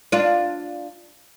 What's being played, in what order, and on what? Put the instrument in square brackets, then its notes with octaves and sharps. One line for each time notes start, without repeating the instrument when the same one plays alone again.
[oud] D4 F4